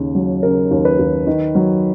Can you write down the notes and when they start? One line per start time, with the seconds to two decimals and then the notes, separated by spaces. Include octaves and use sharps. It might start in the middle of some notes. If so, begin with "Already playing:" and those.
Already playing: D#2 C#3
0.15 F#3
0.43 C#3 A#4
0.71 D#2
0.85 B4
0.99 D#2
1.27 D#3
1.55 F#3